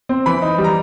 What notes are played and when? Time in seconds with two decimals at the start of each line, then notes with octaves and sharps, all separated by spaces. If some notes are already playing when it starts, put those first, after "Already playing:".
0.09 C4
0.26 E3 B5
0.42 D#4
0.58 G3
0.64 A#5